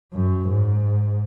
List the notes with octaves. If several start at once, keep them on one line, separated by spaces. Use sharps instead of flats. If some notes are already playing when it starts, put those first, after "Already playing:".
F#2
G#2